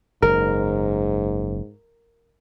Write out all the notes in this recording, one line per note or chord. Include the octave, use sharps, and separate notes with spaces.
F#1 G#2 A#4